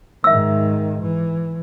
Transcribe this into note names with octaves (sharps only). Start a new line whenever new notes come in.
G#2 D#3 E5 E6
E3